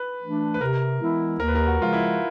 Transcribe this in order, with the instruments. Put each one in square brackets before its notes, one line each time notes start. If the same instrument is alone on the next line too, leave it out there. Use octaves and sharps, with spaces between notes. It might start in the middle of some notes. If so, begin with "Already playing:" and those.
Already playing: [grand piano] B4
[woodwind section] E3 A3 D4
[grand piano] B4
[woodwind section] C3 [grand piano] A#4
[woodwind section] E3 G#3 B3 E4
[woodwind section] D#2 [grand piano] A#4
[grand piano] B4
A#4
F#4
[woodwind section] C#3 F3 G#3 [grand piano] F4
[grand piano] E4